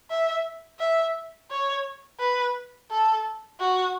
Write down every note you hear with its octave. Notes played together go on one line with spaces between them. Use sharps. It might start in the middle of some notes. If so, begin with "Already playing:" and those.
E5
E5
C#5
B4
A4
F#4